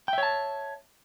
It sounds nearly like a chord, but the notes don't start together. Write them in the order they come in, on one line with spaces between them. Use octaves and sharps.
G5 E5 C#5 A5